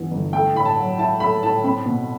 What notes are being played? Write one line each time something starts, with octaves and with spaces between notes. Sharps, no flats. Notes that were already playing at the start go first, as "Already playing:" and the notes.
Already playing: G2 E3 B3
G1
A3 G5
A2 B5
A5
F#3
E4 A5
A3 B5
A2 A5
C4 B5
B2